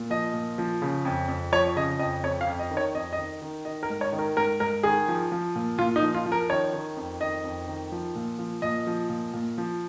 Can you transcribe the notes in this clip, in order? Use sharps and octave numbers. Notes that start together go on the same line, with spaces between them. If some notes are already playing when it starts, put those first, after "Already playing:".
Already playing: A#2
F3 D#5
A#2
F3
C#3
F2
F2
F3 C#5
C#3 D#5
F2 D#5
F2 C#5
F5
F2
D#5
D#3
C#5
F2 D#5
D#5
D#3
D#3
D#3 D#5
A#4
G#2
C#5
D#3
A#4
G#2 A#4
G#2 A#4
D#3 G#4
F3
F3
A#2
A#2 F4
D#4
F3
F4
F3
A#4
D#3 C#5
D#3
F2
D#3 D#5
F2
D#3
F3
A#2
F3
A#2 D#5
F3
A#2
A#2
F3